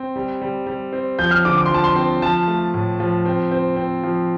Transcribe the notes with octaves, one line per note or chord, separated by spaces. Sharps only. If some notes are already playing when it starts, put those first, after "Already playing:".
Already playing: C4
G3
G3
G3
C4
F3 G6
F6
D3 D6
D6
C6
F3 A5
C6
C4
F3 A5
A3
A2
F3
C4
C4
C4
F3